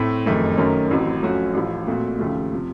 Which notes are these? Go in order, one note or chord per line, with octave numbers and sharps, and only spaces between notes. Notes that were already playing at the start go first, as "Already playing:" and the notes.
Already playing: A2 A3 C4
F#1 F2 D#3 A3
F#2 D#3 A3 C#4
A1 A2 F#3 C4
F#2 F3 A3 C#4 F#4
A1 A2 F3
A#2 A3 C4 F#4
D#2 C#3 F3 A3
C3 F3